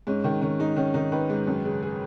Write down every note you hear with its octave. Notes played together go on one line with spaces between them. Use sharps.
G#2 C#4
D#3
D#3 C#4
G#2 D#4
D#3 C#4
D#3 D#4
D#3 B4
G#2
F#2
C#3
G#4